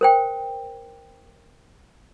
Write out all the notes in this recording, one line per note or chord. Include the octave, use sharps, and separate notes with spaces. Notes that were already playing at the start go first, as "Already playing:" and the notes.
A#4 C5 G5